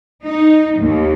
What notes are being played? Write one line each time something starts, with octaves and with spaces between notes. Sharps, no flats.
D#4
D#2